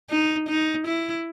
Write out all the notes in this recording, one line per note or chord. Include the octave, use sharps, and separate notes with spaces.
D#4
D#4
E4